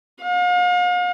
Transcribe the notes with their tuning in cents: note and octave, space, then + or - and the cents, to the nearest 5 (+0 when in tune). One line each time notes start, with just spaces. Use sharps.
F5 +40